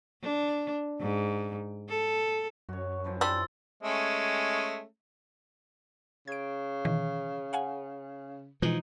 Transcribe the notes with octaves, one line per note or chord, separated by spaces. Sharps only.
D4
G#2
A4
F#2 F#4 C#5
E3 F3 C4
G3 D4 C6 E6 A6
G#3 A3 C#4
C#3 G#6 D7
B2 D#3 E3
F5 F#5 G#5
B2 E3 F3 G#3 D#4